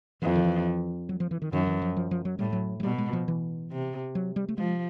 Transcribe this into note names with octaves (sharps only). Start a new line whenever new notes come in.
F2 E3
D#3
E3
F#3
F3
E3
D#3
F#2 D#3
E3
F3
F3
F3
F#3
A2 G3
F#3
F#3
B2 G3
G#3
F3
E3
C3
F#3
G3
A3
F3 G#3